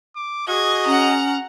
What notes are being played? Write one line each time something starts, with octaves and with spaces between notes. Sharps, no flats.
D6
F#4 G#4 D#5 G#6
C#4 F#5 A#5